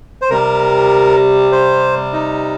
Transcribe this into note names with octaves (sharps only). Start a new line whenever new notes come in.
C5
C3 G3 A#4
C5
D#4